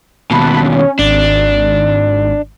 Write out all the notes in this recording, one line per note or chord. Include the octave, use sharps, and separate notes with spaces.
D#2 B2 A5 B5 F#6
C#4
G#1 D4